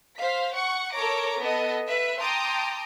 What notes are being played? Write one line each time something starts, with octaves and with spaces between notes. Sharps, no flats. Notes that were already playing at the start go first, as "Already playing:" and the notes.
C5 F5 B6
F#5 C#6 C#7
A4 A#4 C#5 A#5 D6
B3 A4 D#5
B4 E5
G5 A5 A#5 C6 D6 D#6